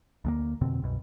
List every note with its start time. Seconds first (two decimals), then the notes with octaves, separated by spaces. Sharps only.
0.25 D2 G#3 A#3
0.61 F2 B2 D3 C4
0.82 C2 F#2 B2